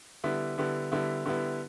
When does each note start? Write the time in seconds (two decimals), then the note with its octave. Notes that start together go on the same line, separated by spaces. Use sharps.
0.24 D3 G3 B3 E4
0.58 D3 G3 B3 E4
0.92 D3 G3 B3 E4
1.26 D3 G3 B3 E4